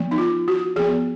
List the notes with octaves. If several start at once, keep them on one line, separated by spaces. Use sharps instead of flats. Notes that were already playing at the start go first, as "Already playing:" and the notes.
Already playing: F3 B3
D#4
F4
F#4
F3 B3 G#4